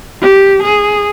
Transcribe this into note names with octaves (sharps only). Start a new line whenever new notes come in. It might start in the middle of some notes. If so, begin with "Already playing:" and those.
G4
G#4